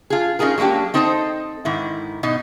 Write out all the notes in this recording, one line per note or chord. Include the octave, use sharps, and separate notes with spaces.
F4 G#4
C#4 D#4 F4 G#4 A#4
F#3 G#3 A#3 D4 G4
C4 D#4 A4 C5 D5 D#5
G#2 D#3 E4
B2 D#4 D#5